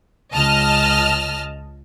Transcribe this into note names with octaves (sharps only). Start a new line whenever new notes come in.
C#2 D#5 A5 F6